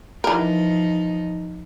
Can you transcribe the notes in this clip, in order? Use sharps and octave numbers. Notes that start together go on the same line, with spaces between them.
E3 F3 D#4 A#4